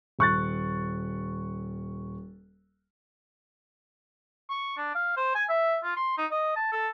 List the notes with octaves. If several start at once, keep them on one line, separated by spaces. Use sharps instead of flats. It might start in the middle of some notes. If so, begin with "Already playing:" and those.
D#1 C#6 F#6 A6
C#6
D4
F5
C5
G#5
E5
F4
C6
D#4
D#5
A5
A4